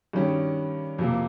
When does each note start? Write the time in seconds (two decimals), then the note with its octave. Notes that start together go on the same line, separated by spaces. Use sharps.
0.13 G2 D#3 G3 C#4 G4
0.99 F2 C3 F3 A#3